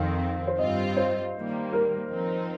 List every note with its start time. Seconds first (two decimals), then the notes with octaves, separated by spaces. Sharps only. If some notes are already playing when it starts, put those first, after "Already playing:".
Already playing: F2 D#3 C4 F5
0.47 C5
0.58 G2 G3 C4 F4 D#5
0.97 C5
1.35 D#3 G3 A#3
1.73 A#4
2.11 F3 C4 D#4